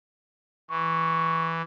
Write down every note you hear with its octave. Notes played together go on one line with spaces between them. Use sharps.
E3 C#6